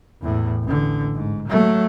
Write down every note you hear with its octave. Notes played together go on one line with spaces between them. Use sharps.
E2 A2
A1 D3
G#2
F#3 A3